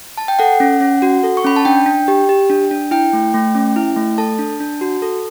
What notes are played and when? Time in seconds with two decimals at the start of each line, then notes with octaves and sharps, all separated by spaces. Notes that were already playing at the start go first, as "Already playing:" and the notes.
0.17 A5
0.28 G5
0.39 A4 F#5
0.60 C#4
0.81 C#4
1.02 F#4
1.23 A4
1.37 C#6
1.44 C#4 B5
1.56 A5
1.65 D4 G5
1.86 D4
2.08 G4
2.29 G4
2.50 D4
2.71 D4
2.91 E4 G5
3.13 A3
3.34 A3
3.55 C#4
3.76 E4
3.96 A3
4.18 A4 A5
4.39 D4
4.60 D4
4.81 F#4
5.02 A4